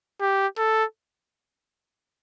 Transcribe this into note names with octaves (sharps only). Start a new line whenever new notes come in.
G4
A4